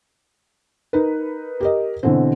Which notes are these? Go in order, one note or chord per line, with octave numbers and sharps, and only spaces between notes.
D#4 A#4 B4
G4 A#4 D#5
B2 D3 E3 C4